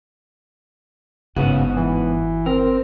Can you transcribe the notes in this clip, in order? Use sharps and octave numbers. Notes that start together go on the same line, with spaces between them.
G1 G#2 C#3 B3 F#4
E3
C4 A#4